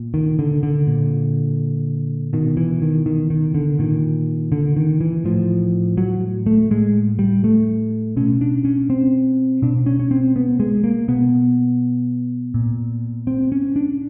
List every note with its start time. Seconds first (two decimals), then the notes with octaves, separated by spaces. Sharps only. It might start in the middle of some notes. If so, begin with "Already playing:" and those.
Already playing: A#2
0.14 D#3
0.39 D3
0.63 D3
0.87 A#2
2.33 B2 D#3
2.57 E3
2.82 D#3
3.06 D#3
3.30 D#3
3.54 D3
3.79 A#2 D#3
4.52 D3
4.77 D#3
5.01 E3
5.25 A2 F3
5.97 F#3
6.46 A3
6.71 A2 G#3
7.19 G3
7.44 A3
8.17 B2 C#4
8.41 D4
8.65 C#4
8.90 C4
9.62 B2 D4
9.86 C#4
9.99 C#4
10.11 C4
10.36 B3
10.60 G#3
10.84 A#3
11.08 B2 B3
12.54 A#2
13.27 C4
13.52 C#4
13.76 D4